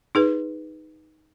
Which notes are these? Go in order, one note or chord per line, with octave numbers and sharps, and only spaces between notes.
D#4 G#4 B4